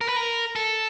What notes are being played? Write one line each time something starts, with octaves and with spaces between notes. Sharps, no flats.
A#4
B4
A#4
A4